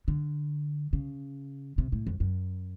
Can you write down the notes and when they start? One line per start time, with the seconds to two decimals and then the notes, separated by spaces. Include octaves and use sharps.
0.08 D3
0.93 C#3
1.78 C3
1.92 A2
2.07 F2
2.20 F#2